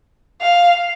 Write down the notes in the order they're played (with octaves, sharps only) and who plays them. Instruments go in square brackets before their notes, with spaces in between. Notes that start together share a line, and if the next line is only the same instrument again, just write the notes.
[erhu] F5